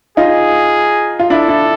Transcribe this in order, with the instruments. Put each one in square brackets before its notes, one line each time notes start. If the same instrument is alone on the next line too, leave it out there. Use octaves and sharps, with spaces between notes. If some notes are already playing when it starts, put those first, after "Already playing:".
[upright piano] D#4 F4 [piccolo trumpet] G#4
[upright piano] F4
[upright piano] D4 E4 [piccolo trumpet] A4
[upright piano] D4 E4